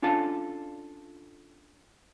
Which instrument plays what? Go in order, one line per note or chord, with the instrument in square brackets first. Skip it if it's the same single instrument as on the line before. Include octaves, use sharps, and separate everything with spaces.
[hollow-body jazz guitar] C#4 D4 F4 A4 F5 A5